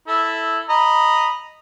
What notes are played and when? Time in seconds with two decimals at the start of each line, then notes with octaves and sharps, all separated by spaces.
0.08 E4 A4
0.69 D#5 A#5 B5